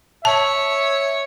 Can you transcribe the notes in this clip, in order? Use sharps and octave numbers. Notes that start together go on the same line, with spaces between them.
C#5 E5 A5